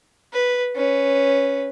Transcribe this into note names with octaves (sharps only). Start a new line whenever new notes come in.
B4
C#4 B4